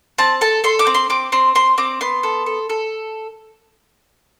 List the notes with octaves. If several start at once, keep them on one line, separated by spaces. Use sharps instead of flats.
C4 A5
A4 A5
A4 C6
D6
C4
C6
C4 D6
C4 C6
C4 C6
C4 D6
B3 C6
A4
A4
A4